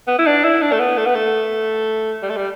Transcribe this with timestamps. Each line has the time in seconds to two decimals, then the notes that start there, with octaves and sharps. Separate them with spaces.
0.07 B3
0.19 E4
0.26 D4
0.44 E4
0.62 D4
0.72 A3
0.79 B3
0.97 A3
1.06 B3
1.15 A3
2.22 G3
2.30 A3
2.36 G3